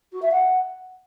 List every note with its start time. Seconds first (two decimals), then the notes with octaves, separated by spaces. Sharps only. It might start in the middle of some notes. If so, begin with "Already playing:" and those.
0.12 F#4
0.22 E5
0.31 F#5